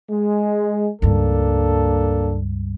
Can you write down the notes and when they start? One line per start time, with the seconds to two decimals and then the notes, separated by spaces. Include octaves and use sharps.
0.10 G#3
1.02 C#2 G2 A#3 D4 A4